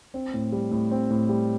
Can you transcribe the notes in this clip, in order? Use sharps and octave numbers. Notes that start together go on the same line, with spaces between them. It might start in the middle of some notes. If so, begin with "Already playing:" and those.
C4
A2
G3
A2
C4
A2
G3